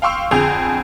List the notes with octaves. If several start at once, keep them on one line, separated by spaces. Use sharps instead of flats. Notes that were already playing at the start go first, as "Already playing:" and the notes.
F5 G5 C6 C#6 E6
F2 D3 G#4 G6 F7